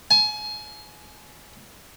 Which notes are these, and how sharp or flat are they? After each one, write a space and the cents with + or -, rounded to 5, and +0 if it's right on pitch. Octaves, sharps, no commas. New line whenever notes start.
G#5 +35